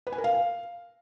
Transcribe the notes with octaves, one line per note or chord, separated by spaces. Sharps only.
B4
G#5
A#4
F5